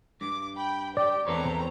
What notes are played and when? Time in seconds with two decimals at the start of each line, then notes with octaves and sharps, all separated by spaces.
0.21 G2 D6
0.57 G5 B5
0.97 G4 D5 G5
1.27 E2 C4 A4 B4 C#5 A#5